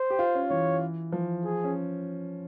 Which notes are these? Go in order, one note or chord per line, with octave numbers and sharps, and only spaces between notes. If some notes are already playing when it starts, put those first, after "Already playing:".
Already playing: C5
G4
F4
C#4
E3 C#5
F3
G#4
C#4